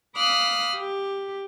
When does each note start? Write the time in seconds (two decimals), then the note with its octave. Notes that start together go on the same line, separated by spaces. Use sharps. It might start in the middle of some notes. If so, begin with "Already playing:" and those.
0.16 F5 B5 D6 D#6 F6 F#6
0.76 G4